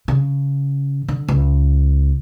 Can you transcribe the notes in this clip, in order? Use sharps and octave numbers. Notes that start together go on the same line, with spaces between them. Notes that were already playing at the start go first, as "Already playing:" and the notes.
C#3
D3
C#2